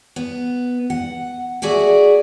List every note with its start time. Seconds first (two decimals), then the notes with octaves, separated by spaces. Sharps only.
0.16 B3
0.90 F#5
1.62 F#4 G#4 D5 E5 F#5